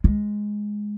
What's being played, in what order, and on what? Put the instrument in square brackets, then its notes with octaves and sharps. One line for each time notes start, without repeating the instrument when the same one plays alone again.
[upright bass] G#3